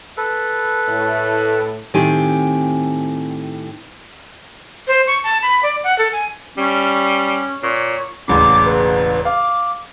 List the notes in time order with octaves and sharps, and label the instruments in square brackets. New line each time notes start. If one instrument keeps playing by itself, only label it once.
[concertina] A4 B4
[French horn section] A2
[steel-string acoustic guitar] A2 D#3 C4 G4 G#5
[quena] C5
C#6
A5
B5
D5
F#5
A4
G#5
[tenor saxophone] G3 [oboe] C#4
[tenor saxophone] A#2 [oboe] C#5
[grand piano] E1 A1 C#3 [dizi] D6
[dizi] B4
[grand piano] F5 [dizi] D6